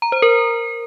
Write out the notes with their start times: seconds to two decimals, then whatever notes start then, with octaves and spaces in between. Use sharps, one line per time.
0.02 A#5
0.12 C5
0.22 A#4